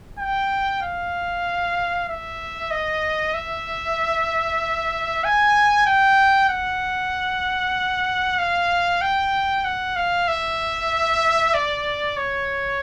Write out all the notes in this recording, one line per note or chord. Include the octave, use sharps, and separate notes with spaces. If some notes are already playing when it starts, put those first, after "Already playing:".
G5
F5
E5
D#5
E5
G#5
G5
F#5
F5
G5
F#5
F5
E5
D5
C#5